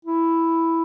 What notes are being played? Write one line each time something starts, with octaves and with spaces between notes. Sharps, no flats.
E4